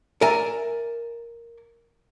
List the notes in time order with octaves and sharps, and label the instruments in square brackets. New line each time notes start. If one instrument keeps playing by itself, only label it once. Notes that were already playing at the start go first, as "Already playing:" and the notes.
[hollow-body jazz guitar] A#4 D5 E5 G#5 A#5